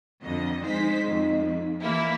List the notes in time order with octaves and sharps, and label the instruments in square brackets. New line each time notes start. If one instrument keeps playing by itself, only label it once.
[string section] F2 D3 D#5
[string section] G#3 C5 B6 [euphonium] D#4
[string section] F2
E3 A#3 E4